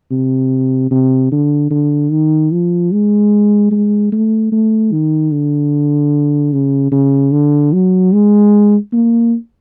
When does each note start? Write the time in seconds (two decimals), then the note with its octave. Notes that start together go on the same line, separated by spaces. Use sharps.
0.11 C3
0.91 C3
1.32 D3
1.71 D3
2.11 D#3
2.52 F3
2.92 G#3
3.72 G#3
4.12 A3
4.52 A3
4.92 D#3
5.31 D3
6.53 C#3
6.92 C#3
7.32 D3
7.73 F#3
8.13 G#3
8.93 A#3